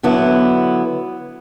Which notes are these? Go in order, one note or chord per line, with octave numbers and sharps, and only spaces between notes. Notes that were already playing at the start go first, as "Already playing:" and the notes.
D3 F#3 B3 E4